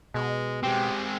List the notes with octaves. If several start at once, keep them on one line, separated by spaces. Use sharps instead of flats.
B2 G#3
G#3 C4 G4